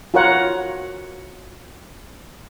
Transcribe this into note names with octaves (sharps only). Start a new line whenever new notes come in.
F4 F#4 A#4 C#5 F#5